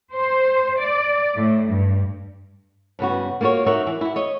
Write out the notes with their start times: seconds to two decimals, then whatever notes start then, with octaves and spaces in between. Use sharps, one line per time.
0.13 C5
0.79 D5
1.37 A2
1.68 G2
2.99 G2 C#3 B3 F#4
3.41 A#3 F4 F#4 A#4 C#5
3.66 D#4 F#4 A#4 C#5 E5
3.86 E3
4.01 E4 F#4
4.16 C#5 D#5